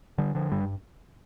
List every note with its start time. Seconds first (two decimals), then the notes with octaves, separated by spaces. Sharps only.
0.18 D3 G3
0.35 D3 F3
0.52 G2 G3